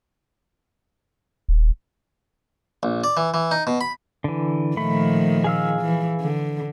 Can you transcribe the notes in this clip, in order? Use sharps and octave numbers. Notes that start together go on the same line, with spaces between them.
D#1
A#1
D5
E3
E3
D#4
B2
B5
D3 E3
A#2 D#3 F3 A3 B5
G#4 F5 E6
E3
D3